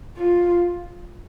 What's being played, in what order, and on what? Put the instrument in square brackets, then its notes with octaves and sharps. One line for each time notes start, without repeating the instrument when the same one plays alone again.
[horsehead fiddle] F4